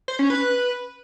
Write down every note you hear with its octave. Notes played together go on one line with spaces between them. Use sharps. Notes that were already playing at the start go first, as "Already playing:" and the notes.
C5
C#4
B4